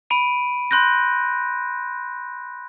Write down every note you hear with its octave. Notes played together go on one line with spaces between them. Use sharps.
B5 D7 D#7
B5 C6 F#6 G6 A#6